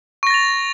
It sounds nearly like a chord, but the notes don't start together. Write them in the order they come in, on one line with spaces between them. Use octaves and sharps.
C#6 A#6 A6 F7